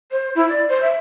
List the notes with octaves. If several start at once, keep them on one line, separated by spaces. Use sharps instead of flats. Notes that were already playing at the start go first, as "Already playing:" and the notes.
C5
E4
D5
C5
E5